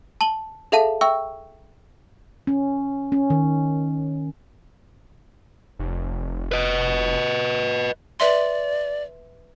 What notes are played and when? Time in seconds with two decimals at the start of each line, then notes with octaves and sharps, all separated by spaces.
0.21 A5 F#7 G7
0.72 G#4 A4 E5 F5 A5 D#7
1.01 E5 G5 C#6 E6
2.47 C#4
3.12 C#4
3.30 D#3
5.79 F1
6.52 B4 D#5
8.20 B4 D5 E5 C6